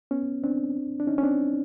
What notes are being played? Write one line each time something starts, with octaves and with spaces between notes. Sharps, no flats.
B3 C#4
C4 D4
D4
C#4 D#4
C#4
C4 D4